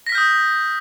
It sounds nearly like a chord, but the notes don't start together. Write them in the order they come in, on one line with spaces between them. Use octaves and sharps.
A#6 B6 F6 G6 D#6